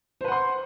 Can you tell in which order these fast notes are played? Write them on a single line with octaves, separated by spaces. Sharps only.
C5 B4 F#5 C6